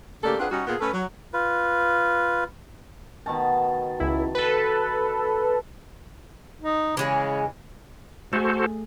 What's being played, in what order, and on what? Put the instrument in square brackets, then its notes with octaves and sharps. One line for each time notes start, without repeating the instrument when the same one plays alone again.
[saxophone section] C#3 A3 A#3 G4 A4 D5
C4 D4 F4 G#4 B4 F#5
G3 C#4 D#4 F#4
A#2 B3 F4 G#4 A#4
A3 C#4 A4 B4
F#3
[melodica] F4 B4
[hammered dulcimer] B2 D#3 A5
[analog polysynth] C#2 E4
A4 B4
[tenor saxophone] D#4
[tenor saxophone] C#3 [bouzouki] E3 G#3 C#4
[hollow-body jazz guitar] A3 G#4 [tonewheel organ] F#4 A4 C5